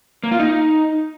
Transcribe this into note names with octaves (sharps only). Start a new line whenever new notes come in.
A#3
F4
D#4